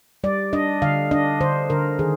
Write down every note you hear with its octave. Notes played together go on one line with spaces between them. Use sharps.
G3 D5
D4 D#5
D3 F5
D4 D#5
D3 C5
D3 A#4
D#3 G#4